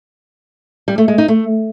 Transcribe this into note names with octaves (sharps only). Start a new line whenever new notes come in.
G3
A3
G#3
D#4
A3